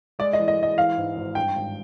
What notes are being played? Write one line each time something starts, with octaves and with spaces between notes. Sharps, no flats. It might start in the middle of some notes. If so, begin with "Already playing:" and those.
G#3 D5
D#5
E3
D#5
G#3
D#5
E3 F5
G#2
G#1
G2 G5
G#1